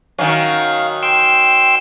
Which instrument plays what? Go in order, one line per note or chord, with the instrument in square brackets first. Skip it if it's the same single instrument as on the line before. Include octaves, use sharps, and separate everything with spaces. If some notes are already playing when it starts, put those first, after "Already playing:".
[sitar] D#3 F#3 C#4 [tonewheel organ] F5
[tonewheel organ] G5 C6 E6